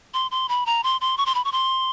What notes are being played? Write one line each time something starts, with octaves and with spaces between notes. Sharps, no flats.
C6
C6
B5
A#5
C6
C6
C#6
C6
B5
C#6
C6